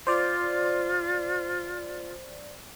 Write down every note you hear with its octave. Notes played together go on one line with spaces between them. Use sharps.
F4 C5 D5